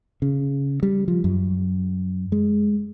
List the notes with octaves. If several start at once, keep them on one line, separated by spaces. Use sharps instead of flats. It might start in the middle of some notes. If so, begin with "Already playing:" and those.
C#3
G3
F3
F#2
G#3